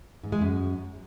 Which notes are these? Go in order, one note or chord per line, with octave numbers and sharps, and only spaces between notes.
G#2
G#3
F#2